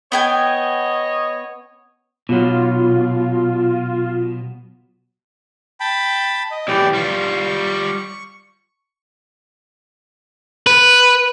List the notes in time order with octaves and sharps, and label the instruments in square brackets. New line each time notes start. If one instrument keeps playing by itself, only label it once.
[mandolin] B3 G5 G#5 [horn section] C#5 D#5
[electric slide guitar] B2 F#3 [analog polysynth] F4
[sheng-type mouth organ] G5 A5 B5
D#5
[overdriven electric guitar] B1 E3 [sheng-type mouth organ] G4 D5
[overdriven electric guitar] G3 F4 [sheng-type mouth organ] C#6
[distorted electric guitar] B4